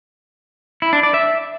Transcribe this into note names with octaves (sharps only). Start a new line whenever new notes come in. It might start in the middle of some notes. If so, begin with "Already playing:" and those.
E4
D4
D5
E5